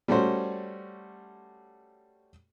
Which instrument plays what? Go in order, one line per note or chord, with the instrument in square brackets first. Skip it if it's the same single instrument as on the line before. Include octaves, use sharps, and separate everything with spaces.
[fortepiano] G3 A3 C#4 F#4 C5